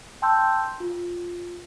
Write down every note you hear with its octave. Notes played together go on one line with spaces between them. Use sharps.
G5 A5 C6 E6 G6
F4